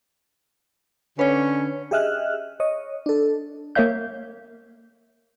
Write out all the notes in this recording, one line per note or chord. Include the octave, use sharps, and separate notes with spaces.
D3 C#4 B4 C#5
G4 G#4 D#5 E5 F6 F#6
C#5 D#5
D4 A4
A#3 A#4 C#5 E5 F5 G6